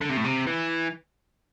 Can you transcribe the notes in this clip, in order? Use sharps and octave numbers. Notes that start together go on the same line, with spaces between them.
D3
C3
A2
C3
E3